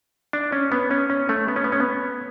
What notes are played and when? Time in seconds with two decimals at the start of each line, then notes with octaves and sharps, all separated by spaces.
0.33 D4
0.52 C#4
0.72 B3
0.91 C#4
1.10 C#4
1.29 A3
1.48 B3
1.56 C#4
1.64 B3
1.72 C#4
1.80 B3